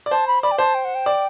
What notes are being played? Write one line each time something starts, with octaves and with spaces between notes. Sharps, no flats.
D5
C5 A5
B5
D5 B5
G5
C5 A5
G5
F#5
G5
D5